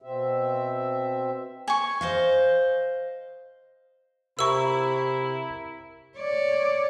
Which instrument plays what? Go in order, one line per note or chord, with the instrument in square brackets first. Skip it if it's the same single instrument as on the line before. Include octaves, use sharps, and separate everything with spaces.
[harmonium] B2 C4 E5
[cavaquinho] G#5 C#6
[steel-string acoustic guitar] C5 D#5 F5
[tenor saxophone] C3 [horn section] E4 [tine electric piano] A#4 E5 A#5 [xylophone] C#6 E6
[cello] C#5 D5